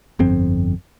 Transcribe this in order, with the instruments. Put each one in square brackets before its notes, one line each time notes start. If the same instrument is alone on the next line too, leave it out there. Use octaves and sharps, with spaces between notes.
[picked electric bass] G1 F2 C4